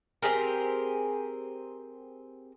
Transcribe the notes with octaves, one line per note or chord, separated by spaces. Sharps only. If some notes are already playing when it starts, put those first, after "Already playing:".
C4 G4 G#4 A#4